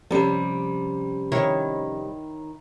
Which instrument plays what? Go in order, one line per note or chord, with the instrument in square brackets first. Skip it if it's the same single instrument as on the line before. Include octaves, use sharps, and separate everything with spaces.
[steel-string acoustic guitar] C3 G3 [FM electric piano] F3 C#4
[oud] D#3 E4 C#5